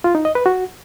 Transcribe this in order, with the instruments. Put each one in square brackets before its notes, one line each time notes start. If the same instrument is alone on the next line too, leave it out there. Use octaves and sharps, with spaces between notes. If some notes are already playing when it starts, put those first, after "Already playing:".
[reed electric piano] F4
D#4
D#5
B4
F#4